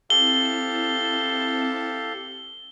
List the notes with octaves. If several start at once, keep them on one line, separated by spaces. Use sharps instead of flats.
C4 E4 G4 A4 F5 A5 G7